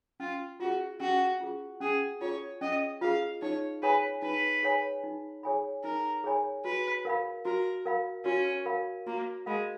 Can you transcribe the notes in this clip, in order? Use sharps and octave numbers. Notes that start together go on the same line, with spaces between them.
C#4 F4
F4 F#4 G#4
C#4 F#4
F4 G#4
C#4 G#4
F4 G#4 C#5
C#4 D#5
F4 G#4 F5
D#4 C#5
G#4 B4 C#5 G#5 B5
D#4 B4
G#4 C#5 G#5 B5
D#4
G#4 C#5 G#5 B5
D#4 A#4
G#4 C#5 G#5 B5
F#4 B4
A#4 F5 B5
F#4 A#4
A#4 F5 B5
C#4 F#4
A#4 F5 B5
A#3 F#4
G#3 A#4 F5 B5